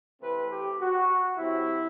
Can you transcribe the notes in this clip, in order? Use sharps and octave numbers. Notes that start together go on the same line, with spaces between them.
C3 E3 A3 C4 B4
G4
F#4
C3 F#3 C4 E4